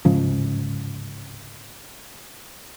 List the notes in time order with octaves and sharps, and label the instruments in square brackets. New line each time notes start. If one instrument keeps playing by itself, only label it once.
[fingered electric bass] D1 G#2 C#3 F3